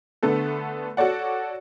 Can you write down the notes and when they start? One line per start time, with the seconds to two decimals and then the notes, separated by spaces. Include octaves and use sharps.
0.23 D3 A3 B3 A4
0.97 F#4 A4 C#5 D5 F#5